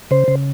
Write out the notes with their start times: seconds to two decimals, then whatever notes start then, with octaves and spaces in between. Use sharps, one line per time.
0.11 C#3 C5
0.28 C#3